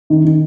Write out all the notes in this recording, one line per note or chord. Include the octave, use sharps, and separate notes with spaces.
D#3
D#3